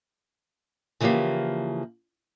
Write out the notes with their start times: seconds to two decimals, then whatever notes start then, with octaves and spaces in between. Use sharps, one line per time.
1.00 C#3 E3 F3 A#3 G4 F5